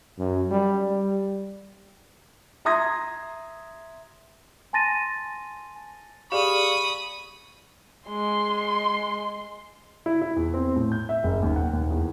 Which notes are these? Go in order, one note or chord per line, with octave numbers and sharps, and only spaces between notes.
F#2
G3
G3
E5 A#5 C6 D#6 G#6 A#6
G#5 A5 C6 A6 A#6 D#7
G4 G#4 D5 F5 B5 C#6 D#6
G#3 C6
E4
E4
E2
C4
A2
G6
E5
F#1
D#2
F#5
D#2
E2